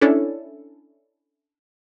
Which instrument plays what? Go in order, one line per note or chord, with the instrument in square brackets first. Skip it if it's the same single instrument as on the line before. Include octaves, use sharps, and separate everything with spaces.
[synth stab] C#4 D4 E4 A4